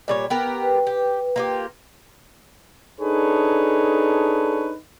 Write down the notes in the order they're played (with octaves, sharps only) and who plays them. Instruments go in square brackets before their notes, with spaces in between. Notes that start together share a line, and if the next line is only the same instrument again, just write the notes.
[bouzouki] A#2 G3 C#5
B3 G4 A#4
[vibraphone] B4
[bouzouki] G4
A#3 F4 G4
[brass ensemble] D4 D#4 G#4 A4 B4 C#5